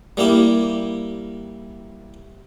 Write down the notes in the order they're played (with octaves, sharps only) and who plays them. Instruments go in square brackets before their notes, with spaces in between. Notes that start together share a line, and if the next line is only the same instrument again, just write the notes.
[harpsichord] G3 A#3 E4 G4